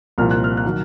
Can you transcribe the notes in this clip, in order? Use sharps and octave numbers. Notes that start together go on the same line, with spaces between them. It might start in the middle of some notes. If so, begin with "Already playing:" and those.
C2 A#2 F3 F6
F#6
F6
F#6
D#3 F#3